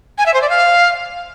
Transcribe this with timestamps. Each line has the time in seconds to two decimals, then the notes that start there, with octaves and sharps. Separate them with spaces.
0.18 G#5
0.26 E5
0.34 C5
0.42 D5
0.50 F5